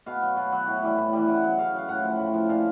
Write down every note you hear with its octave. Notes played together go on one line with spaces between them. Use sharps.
B2 F5
F#3
B2
F#3
A2
E3 G3
A2
E3 G3
C#3 F#5
F#3
C#3 F5
F#3 F5
A2 F#5
F3
A2
F3
A#2 F5